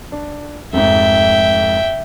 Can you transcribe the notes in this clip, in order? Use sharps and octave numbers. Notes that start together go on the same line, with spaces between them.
D4
F1 F2 G#2 E5 G5